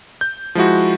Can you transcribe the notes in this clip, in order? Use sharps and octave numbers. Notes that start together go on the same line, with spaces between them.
G6
F3 G#3 E4 F#4